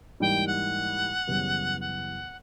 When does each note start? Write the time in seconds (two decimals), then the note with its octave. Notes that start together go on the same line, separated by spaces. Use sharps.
0.20 G#2 E3 G3 A#3 D#4 G5
0.47 F#5
1.27 F#2 C#3 E3 G3 B3
1.80 F#5